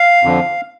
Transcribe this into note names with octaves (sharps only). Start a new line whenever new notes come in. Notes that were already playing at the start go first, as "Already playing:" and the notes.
Already playing: F5
F2 D3 F3